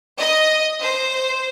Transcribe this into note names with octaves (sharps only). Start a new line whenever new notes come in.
D#5
C5